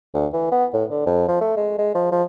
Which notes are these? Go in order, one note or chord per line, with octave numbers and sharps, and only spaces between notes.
D2
E3
B3
A2
D3
F2
F3
A3
G#3
G#3
F3
F3